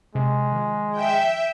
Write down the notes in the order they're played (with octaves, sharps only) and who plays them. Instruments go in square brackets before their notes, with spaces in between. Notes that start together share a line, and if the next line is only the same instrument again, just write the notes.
[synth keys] C3 [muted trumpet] G#3
[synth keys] D#3 F3
[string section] E5 G5